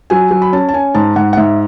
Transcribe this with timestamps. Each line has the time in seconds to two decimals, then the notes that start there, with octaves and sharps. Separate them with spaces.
0.10 F#3 G#5
0.31 F#3
0.42 B5
0.53 C#4 A5
0.69 A5
0.74 C#4 G#5
0.94 G#2 A5
1.16 G#2 F#5
1.33 F#5
1.37 G#2 E5